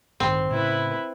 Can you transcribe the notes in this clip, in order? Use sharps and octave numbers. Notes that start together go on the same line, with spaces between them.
A1 G2 D#3 C4
A2 C#3 E4 B4